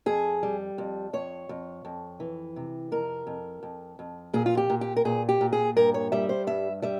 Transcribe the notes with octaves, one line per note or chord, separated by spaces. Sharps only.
F2 G#4
G3
F2
F2 C#5
F2
F2
E3
C3
F2 A#4
F2
F2
F2
A#2 G#4
F4
G4
A#2
G4
A#4
A#2 G#4
G4
A#2
G#4
G2 A#4
C#5
G3 E5
C5
G2 E5
G3 E5